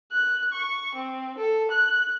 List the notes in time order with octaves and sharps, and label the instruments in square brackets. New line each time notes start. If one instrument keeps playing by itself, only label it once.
[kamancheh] F#6
C#6
C4
A4
F#6